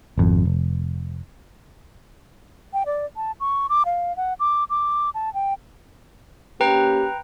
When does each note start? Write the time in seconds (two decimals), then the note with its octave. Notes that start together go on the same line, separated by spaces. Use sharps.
0.18 G#1 F2
0.45 F1
2.73 G5
2.86 D5
3.16 A5
3.40 C#6
3.69 D6
3.86 F5
4.17 F#5
4.40 D6
4.70 D6
5.14 A5
5.34 G5
6.61 A#3 C#4 G4 B4 G5 A#5